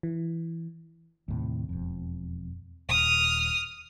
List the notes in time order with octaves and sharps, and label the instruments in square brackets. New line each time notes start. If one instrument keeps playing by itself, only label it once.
[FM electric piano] E3
[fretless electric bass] D#2 A2 C3
E1 F2
[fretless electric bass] D#1 [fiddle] D#6 F6